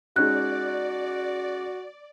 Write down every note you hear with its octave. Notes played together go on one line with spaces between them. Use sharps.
G#3 C#4 D#4 F#4 D5 F#6